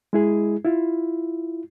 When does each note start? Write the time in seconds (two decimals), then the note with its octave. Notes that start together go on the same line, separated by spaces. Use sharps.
0.13 G#3 E4 G#4
0.64 E4 F4